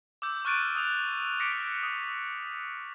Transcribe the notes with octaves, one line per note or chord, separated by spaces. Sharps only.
D6 E6 G6
C#6 F6 F#6 A6 D7 D#7
D#6 F7
D6 A#6 B6 C#7 D7
D#6